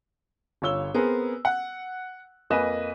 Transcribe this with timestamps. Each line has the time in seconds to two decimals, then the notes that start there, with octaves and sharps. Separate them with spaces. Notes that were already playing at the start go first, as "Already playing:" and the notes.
0.62 G1 F4 C#5 E6 G7
0.95 B3 C4 G#4 A#4
1.45 F#5
2.50 F2 A#3 B4 D#5 G#5 E7